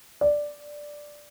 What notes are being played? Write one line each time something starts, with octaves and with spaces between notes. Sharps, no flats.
D5